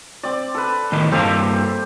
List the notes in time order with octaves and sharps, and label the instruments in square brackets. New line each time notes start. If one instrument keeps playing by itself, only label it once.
[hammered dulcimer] C4 D5
A4 B4
[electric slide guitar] A2 D#3 D#5
[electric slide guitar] G2 A#3 F5 [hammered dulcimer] C4 G4 A4